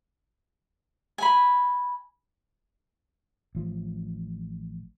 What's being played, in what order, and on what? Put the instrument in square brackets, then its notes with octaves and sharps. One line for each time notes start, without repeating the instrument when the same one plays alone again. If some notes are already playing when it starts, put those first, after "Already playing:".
[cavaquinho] G#5 B5
[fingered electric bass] A1 F3